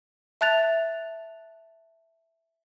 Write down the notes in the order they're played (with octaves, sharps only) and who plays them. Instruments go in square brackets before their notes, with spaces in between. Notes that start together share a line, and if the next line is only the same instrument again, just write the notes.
[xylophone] E5 A5 F#6 A6 F7